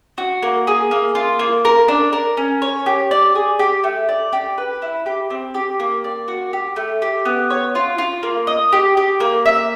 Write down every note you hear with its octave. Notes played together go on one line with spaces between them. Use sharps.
F#4
A#3
G#4
A#3
F4
A#3
A#4
D4
A#4
C#4
C#5
G4
D5
G#4
G4
A3
D5
G4
B4
E4
G4
C4
G4
A#3
D5
F#4
G4
A3
G4
B3
C#5
F4
F4
A#3
D#5
G4
G4
A#3
E5